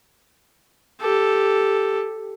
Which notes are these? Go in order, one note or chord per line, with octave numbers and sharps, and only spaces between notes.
G4 A4